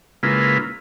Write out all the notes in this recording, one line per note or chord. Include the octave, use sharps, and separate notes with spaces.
C#3 G#3 A#3 E4 F4 B4